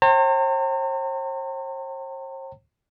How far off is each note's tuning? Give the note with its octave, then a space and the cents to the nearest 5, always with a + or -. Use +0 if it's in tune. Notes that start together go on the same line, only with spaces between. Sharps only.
C5 +45 G5 -25 A#5 -45